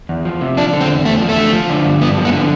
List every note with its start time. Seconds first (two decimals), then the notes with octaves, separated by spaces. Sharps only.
0.09 E2
0.25 F3
0.41 C3
0.57 F3 D4
0.73 D3
0.81 C4
0.89 E2
1.05 E2 A3
1.21 F3
1.29 A3
1.37 D3
1.53 F3
1.69 D3
1.85 G2
2.01 G2 B3
2.17 F3
2.25 B3
2.33 D3